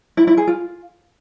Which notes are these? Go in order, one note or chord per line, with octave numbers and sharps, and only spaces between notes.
E4
E4
G#4
F4